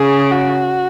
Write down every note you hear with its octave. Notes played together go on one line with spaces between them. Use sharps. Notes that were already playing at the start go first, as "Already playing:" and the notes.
Already playing: C#3 G#4
F#4